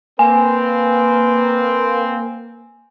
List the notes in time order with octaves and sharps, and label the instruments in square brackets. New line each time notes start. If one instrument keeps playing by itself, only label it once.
[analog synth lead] A#3 [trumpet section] C4 [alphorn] B4 [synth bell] G#5